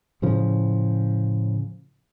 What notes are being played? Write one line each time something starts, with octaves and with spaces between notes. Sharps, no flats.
A2 C#3 F3